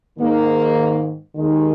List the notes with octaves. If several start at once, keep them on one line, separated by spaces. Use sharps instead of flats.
G#2 D#3 A#3
D#2 D#3 G#3